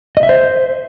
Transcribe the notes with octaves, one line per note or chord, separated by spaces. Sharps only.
D#5
E5
C5